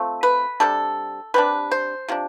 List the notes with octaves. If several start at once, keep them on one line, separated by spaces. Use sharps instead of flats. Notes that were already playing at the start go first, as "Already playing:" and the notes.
Already playing: F3 A3 C4
B4
C3 G3 D4 A4
C3 G3 D4 B4
C5
C3 F3 D4